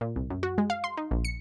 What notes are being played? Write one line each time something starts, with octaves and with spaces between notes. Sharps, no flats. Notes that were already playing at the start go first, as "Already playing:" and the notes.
A#2
C2
F#2
F#4
G#3
F5
C6
D#4
A#1
C#7